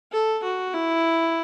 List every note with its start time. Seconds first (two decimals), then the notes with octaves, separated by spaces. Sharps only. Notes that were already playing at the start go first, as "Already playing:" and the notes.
0.12 A4
0.43 F#4
0.74 E4